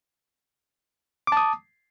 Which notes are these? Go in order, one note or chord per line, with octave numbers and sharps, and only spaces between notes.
A5 D6 D#6